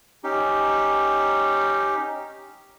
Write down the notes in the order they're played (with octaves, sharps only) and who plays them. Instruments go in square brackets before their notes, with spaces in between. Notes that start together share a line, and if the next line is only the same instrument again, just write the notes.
[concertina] C#4 D#4 G4